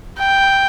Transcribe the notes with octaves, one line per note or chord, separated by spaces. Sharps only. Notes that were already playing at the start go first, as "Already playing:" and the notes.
G5